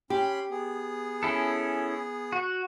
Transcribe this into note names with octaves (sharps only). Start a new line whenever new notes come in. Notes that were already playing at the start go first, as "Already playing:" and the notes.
C#4 G4 B5 C6
B3 G#4
C#4 E4 A4
F#4